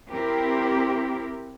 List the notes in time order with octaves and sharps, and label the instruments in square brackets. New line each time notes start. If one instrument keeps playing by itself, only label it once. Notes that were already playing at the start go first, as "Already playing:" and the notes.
[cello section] C4 E4 G4 A#4